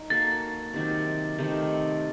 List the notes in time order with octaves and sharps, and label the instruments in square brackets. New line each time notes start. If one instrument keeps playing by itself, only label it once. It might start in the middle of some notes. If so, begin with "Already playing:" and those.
Already playing: [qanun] D#4
[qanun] A#3 F#4 A4 [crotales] A6
[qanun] C3 D#3 F#3
C3 D#3 A3